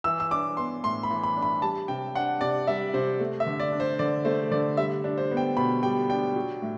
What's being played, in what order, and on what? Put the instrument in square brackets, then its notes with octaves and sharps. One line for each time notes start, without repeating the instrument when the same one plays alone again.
[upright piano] E3 E6
E6
D4 D6
B3 C6
A2 C6
B5
E3
B5
D4
B5
G3 A5
C3 G5
D4 F#5
C3 D5
G3 E5
C3 C5
A3
E5
D3
D5
D4
C5
D3 D5
A3 C5
D3 D5
G3 E5
D4
C5
B3
G5
B2 B5
G3 G5
D4 G5
F#3
A2